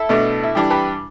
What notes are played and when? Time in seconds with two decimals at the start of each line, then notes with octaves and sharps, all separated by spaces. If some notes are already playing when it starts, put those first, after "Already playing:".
Already playing: E4 A4
0.09 B2 A3 D4
0.43 E4
0.55 E3 G3 D4 G4
0.70 G4 B4